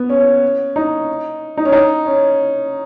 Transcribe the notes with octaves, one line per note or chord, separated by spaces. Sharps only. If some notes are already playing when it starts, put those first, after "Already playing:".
Already playing: B3
C#4
D#4
D#4
C#4
D#4
C#4